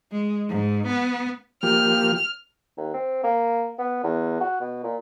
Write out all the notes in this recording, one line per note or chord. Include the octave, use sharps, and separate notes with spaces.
G#3
G#2
B3
F3 A#3 G4 F6
D#2
C4
A#3
B3
E2
F#4
B2
A#2